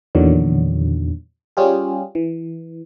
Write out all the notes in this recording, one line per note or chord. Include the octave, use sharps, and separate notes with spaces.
E2 A#2 D3 D#3 F#3
G3 C#4 F4 G4 G#4
E3